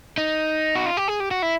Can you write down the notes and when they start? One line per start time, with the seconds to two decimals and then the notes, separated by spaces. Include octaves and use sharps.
0.18 D#4
0.76 F#4
0.86 F4
0.97 G4
1.08 G#4
1.20 G4
1.31 F#4
1.42 E4